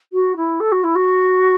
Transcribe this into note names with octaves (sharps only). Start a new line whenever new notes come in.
F#4
E4
A4
F#4
E4
F#4